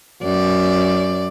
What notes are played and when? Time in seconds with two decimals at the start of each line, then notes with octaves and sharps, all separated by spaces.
0.22 F#2 D5